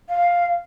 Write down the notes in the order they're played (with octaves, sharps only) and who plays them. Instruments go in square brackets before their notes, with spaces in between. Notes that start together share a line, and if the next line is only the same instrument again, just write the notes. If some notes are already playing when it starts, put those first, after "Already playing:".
[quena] F5